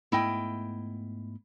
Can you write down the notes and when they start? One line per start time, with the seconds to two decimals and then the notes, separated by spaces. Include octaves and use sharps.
0.12 G#2 A3 B3 E4 D#5 G5